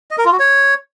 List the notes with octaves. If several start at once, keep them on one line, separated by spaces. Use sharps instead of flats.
D#5
A#4
F4
F#4
C#5